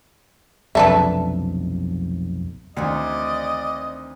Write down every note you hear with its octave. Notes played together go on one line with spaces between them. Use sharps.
F1 B1 F2 D3 A4 B4 E5 A5
D2 D#3 E3 C4 D5 D#5